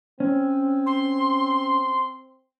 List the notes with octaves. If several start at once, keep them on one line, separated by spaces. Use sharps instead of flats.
C4 C#4
C6